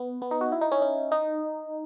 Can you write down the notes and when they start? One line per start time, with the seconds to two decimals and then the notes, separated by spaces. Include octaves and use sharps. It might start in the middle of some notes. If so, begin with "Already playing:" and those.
Already playing: B3
0.22 B3
0.31 D#4
0.41 F#4
0.52 E4
0.61 D#4
0.72 C#4
0.82 C#4
1.12 D#4